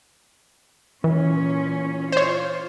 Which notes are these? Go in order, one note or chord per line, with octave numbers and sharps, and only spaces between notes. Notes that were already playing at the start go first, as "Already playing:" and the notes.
A#2 E3 C#4
F4 C5 C#5